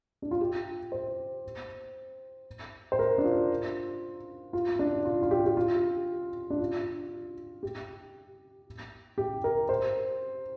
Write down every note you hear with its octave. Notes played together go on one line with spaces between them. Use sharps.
D4
F4
G4
C5
C5
A#4
D4
F4
F4
D4
F4
F4
G4
G4
F4
D4
F4
G4
G4
A#4
C5